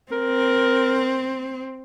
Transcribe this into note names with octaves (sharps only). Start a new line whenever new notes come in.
C4 A#4